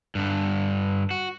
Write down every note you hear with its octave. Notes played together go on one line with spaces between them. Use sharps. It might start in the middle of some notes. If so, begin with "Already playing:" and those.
G2 D3
F#4